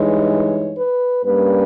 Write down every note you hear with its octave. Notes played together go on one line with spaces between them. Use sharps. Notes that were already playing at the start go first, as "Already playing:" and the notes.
Already playing: G2 E3 G#3 D#4 C#5
B4
G2 G3 A#3 C#4 B4